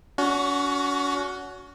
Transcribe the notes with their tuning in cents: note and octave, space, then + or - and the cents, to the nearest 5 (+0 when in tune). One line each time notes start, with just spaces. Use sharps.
C#4 +40 F#4 +0